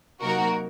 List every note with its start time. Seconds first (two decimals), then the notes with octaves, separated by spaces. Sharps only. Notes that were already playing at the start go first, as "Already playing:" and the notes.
0.22 C3 F#3 A#3 D#4 F#4 A#4